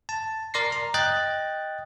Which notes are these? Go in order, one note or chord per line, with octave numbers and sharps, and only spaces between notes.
A5
A#4 D5 C6 A#6 C7
A#5
D#5 G5 F#6 A6